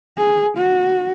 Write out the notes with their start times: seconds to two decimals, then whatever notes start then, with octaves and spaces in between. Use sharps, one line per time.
0.18 G#4
0.57 F#4